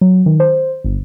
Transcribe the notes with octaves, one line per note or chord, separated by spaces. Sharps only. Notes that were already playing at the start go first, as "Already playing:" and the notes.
F#3
D#3
C5
G1